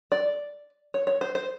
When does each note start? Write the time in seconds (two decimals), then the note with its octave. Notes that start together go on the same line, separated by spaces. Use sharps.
0.12 D5
0.94 C#5
1.07 C#5
1.21 C5
1.35 C5